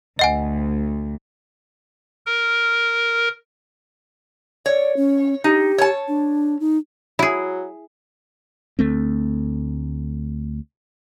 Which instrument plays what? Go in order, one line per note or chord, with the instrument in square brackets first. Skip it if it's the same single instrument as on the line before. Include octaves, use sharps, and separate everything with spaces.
[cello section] D2 [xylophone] D#5 F#5 G#5
[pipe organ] A#4
[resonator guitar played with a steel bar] C#5 [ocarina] D5
[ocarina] C#4
[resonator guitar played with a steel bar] D#4 [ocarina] G4
[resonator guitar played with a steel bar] C#5 A5
[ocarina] D4
D#4
[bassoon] F#3 [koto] E4 G#4
[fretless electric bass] D2 A3 C4